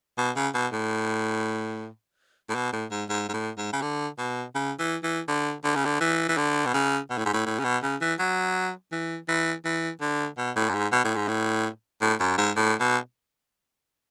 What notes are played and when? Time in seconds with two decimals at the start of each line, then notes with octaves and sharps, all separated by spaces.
0.18 B2
0.36 C#3
0.54 B2
0.72 A2
2.49 A2
2.55 B2
2.73 A2
2.91 G#2
3.09 G#2
3.29 G#2
3.33 A2
3.58 G#2
3.73 C#3
3.82 D3
4.18 B2
4.55 C#3
4.79 E3
5.03 E3
5.28 D3
5.64 D3
5.75 C#3
5.85 D3
6.01 E3
6.29 E3
6.37 D3
6.65 B2
6.74 C#3
7.10 B2
7.18 A2
7.25 G#2
7.33 A2
7.46 A2
7.59 C#3
7.64 B2
7.83 C#3
8.01 E3
8.19 F#3
8.92 E3
9.28 E3
9.65 E3
10.01 D3
10.38 B2
10.56 A2
10.69 F#2
10.74 G#2
10.92 B2
11.04 A2
11.16 G#2
11.28 A2
12.02 A2
12.20 F#2
12.38 G#2
12.56 A2
12.80 B2